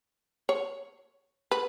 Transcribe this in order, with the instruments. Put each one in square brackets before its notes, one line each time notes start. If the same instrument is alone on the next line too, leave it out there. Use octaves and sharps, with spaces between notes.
[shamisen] C#5
B4